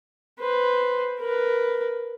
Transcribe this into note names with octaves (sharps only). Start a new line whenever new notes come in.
B4 C5
A#4 B4